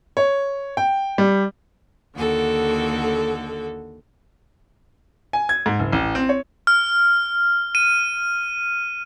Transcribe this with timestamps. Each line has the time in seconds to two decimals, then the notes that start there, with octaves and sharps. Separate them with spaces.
0.17 C#5
0.77 G5
1.18 G3
2.15 D#2 D3 F#4 A4
5.33 G#5
5.49 G#6
5.66 G#2
5.79 F#1
5.92 A1
6.15 C4
6.29 C#5
6.67 F6
7.75 D#7